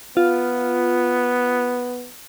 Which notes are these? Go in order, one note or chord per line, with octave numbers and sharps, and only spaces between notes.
B3 F4